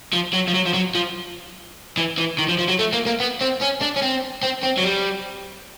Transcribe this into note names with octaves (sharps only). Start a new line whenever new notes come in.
F3
F#3
F3
F#3
F3
F#3
F3
E3
E3
D#3
F3
F3
F#3
A3
A#3
A#3
B3
C4
C#4
D4
C#4
C4
C4
C4
F#3
G3